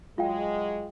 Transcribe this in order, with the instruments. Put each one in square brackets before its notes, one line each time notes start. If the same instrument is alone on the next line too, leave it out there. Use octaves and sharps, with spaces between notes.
[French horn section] F#3 G#3 [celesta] F4 F5 G5